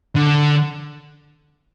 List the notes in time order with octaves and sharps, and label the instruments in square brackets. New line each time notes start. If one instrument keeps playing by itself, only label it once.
[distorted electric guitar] D3